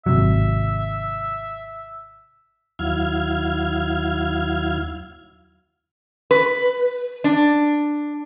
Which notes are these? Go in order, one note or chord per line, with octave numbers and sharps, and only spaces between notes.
G#1 C3 F#3 E5
D#2 F#3 E4 F5 F6 G#6
B4
D4